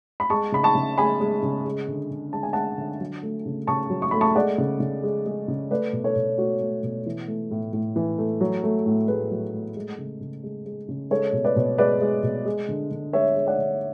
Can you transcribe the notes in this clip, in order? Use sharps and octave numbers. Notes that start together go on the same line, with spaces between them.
B5
G#3 A5 C#6
C#3 B5
A5 C#6
C#3
G#3 G#5 B5
G#3
C#3
G#3
D3
D3
G#3 A5
G#5
G#3 F#5 A5
D3
F#3
A3
C#3
C#3 A5 C#6
F#3
C#6
A3 B5
A5 C#6
G#3 D5 F#5
C#3
C#3
G#3
G#3
C#3
A3 B4 D5
B2
A4 C#5
B2
A3 F#4 A4
A3
B2
E3
A3
A2
A2
E3
A3
F#3
A3
A2
A2 G#4 B4
F#3
A3
G#3
C#3
C#3
G#3
G#3
C#3
G#3 A4 C#5
B2
B4 D5
B2
G#3 B4 D5
G#3
B2
G#3
D3
D3
G#3 C#5 E5
G#3
D5 F#5
D3